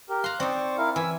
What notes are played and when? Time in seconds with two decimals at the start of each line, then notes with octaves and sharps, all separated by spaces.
0.09 G4 A#4
0.24 F5 A#5 C6 F#6
0.40 C4 D#4 C5 D5 C#6
0.78 E4 A#4 F5
0.96 E3 G#5 E6